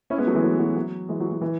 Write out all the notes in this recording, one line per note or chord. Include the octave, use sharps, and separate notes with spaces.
C#4 E4
G#3 B3
F#3 A3
E3 G#3
F#3
F#3
F#3
E3 G#3
F#3
F#3
E3